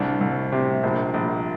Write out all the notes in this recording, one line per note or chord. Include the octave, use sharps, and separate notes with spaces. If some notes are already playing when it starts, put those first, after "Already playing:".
Already playing: C2 D4
C2
C3
A#1
A#1